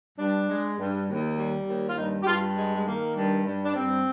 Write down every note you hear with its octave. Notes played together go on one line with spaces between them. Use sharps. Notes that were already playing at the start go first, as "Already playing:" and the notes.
G2 D4
G#3
G2
D#2
G3
D#2
F4
G2 D#4
G4
G2 F4
G#3
G#3
D#3 A#3
G2
G2
D4
G2 C4